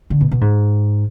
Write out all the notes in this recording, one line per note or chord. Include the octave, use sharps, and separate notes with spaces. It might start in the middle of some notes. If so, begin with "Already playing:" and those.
D3
B2
B2
G#2